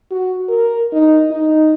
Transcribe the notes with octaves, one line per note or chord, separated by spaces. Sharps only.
F#4
A#4
D#4
D#4